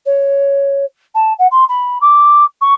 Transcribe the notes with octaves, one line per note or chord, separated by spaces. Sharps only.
C#5
A5
F#5
C6
B5
D6
C#6